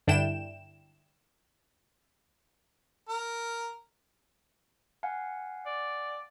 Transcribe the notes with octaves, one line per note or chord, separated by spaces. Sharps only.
G2 D3 D4 E4 G5 E7
A#4
F5 F#5 G#5
D5